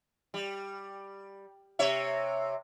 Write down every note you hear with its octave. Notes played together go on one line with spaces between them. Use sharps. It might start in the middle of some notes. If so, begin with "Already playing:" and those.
G3
C3 C#5 E5